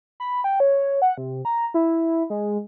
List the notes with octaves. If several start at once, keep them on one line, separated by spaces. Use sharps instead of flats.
B5
G5
C#5
F#5
C3
A#5
E4
G#3